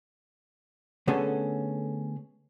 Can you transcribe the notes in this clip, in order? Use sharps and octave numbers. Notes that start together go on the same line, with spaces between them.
D3 A3 B3 C#4 G#4 A4